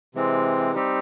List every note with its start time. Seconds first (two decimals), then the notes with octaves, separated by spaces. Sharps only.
0.15 C3 E3 G#3 C4
0.74 G3 C4 D#4 G4